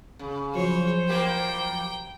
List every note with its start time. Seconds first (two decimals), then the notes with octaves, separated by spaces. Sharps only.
0.19 C#3
0.55 F3 F#3 C5 C#5
1.09 G3 A#3 G4 G5